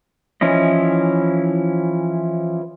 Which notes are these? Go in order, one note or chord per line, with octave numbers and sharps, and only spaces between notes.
E3 F3 C#4 E4 D#5